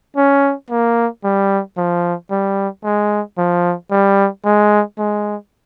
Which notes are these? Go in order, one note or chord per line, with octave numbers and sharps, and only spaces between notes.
C#4
A#3
G3
F3
G3
G#3
F3
G3
G#3
G#3